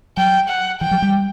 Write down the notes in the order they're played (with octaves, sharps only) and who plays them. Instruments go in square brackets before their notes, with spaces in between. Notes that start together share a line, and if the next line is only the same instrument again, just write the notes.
[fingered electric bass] F#3 [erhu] G5
[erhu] F#5
[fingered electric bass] E3 [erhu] G5
[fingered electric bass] F#3
G3